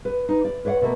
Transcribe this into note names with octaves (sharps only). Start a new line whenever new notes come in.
B4
D#4
D5
B4 C#5 D5 F5 F#5
B2 A3 A#3